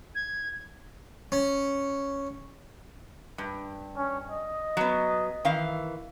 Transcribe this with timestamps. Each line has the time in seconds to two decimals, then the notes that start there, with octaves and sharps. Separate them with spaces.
0.14 G#6
1.32 C#4
3.38 G2
3.97 C#4
4.31 D#5
4.77 F#3 B3
5.45 D#3 E3 F5